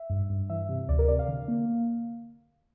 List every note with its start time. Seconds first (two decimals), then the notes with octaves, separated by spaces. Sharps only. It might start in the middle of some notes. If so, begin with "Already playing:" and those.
Already playing: E5
0.10 G2
0.30 G2
0.50 E3 E5
0.69 C3
0.89 D2 D5
0.99 A#4
1.08 C3 D5
1.19 F5
1.28 D3
1.48 A#3